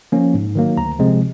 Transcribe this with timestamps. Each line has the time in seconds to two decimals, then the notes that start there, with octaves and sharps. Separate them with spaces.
0.12 F3 A#3 C#4
0.34 G#2
0.55 D#3 F#3 A#3
0.77 D2 A#5
0.99 C3 F3 G#3 C4